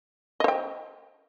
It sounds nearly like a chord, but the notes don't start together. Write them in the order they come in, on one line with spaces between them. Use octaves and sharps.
D#5 C5 G5